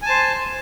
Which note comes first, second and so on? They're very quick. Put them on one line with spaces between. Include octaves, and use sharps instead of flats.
G#5 A5 C5